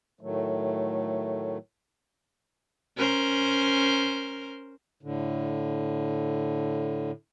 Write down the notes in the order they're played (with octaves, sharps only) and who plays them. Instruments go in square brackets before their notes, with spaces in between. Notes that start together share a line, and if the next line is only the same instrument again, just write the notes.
[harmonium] A2 D#3 F#3 A3
[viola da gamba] C#4 A#4 C5
[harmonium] A2 D3